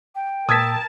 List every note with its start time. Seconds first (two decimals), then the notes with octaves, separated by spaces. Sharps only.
0.15 G5
0.49 A#2 A#4 A5 D#6 E6 G#6 B6